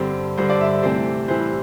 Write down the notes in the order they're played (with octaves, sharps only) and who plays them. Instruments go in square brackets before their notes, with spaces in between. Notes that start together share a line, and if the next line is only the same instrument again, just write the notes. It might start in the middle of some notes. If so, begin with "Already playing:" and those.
Already playing: [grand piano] G2 D3 G3 C4
G2 D3 G3 C5
D5
E5
C3 E3 A3 C4 C5
A2 E3 G3 C4 C5